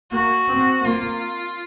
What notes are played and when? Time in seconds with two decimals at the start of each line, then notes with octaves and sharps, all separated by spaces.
0.12 A#3 F#4
0.48 C4
0.85 A#3 F4